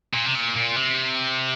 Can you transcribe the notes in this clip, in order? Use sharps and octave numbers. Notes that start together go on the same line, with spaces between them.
A#2
C3
A#2
A#2
C3